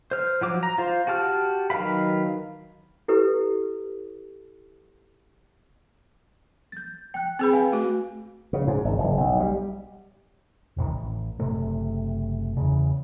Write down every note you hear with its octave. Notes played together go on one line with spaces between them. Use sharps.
C5 F6
F3 F#3 D6
A#5
F4 C5
F#4 G4 A5 F6
D#3 F#3 B4 F5 B5
E4 G4 A4 B4
G6 A6
G5 F#6
C4 G#4 B4 G5 B5
F5 G#5
A3 F#4
C#3
G#2
G#1
F#1
B1
G3
E1 C2 A2 D#3
A1
F#1 C3 A3
E2 C#3